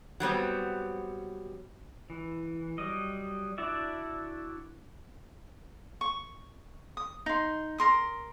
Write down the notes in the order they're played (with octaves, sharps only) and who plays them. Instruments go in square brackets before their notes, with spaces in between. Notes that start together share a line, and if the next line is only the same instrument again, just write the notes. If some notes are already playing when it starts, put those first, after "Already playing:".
[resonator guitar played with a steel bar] F#3 G3 B3 C4
[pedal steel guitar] E3
F#3 G3 D#5
D4 E4 F#4 D5 E5
[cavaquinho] C#6
D#6
D#4 C6
A#4 C6 D#6